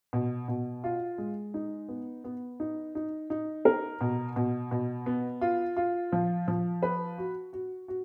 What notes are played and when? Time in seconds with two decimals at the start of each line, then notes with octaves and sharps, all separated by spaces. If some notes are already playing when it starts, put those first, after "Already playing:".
0.13 B2
0.48 B2
0.84 F4
1.18 G#3
1.54 D#4
1.89 B3
2.24 B3
2.60 D#4
2.95 D#4
3.30 D#4
3.65 A#4
4.01 B2
4.36 B2
4.71 B2
5.06 B3
5.41 F4
5.77 F4
6.12 F3
6.48 F3
6.83 B4
7.18 F#4
7.53 F#4
7.88 F#4